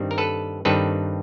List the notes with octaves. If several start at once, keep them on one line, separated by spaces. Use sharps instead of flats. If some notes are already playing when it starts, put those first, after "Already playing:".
Already playing: G2 D#3 G3 C4
A#4
A4 B4
G2 D#3 G3 C4 A4 B4